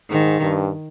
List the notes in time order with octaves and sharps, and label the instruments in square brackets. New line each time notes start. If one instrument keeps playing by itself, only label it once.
[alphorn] G#2 [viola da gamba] D#3
[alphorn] G2